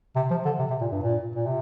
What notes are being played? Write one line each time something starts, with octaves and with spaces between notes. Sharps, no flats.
C3
F3
D3
C3
C3
A#2
G2
A#2
A#2
C3